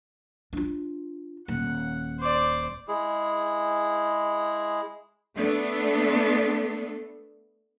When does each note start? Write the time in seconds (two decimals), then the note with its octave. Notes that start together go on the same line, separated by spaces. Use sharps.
0.53 D4 F4
1.48 D#1 F#5
2.20 C5 D5
2.88 G#3 E4 G#4
5.37 A3 B3 D4 A4